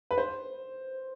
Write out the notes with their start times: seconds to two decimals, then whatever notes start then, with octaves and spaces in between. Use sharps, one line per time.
0.11 B4
0.18 C5